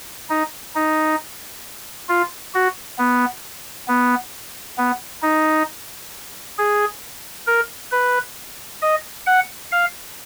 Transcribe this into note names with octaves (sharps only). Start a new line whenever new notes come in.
D#4
D#4
F4
F#4
B3
B3
B3
D#4
G#4
A#4
B4
D#5
F#5
F5